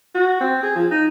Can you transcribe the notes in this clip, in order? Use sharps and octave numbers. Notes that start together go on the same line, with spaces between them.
F#4
C4
G#4
F3
D#4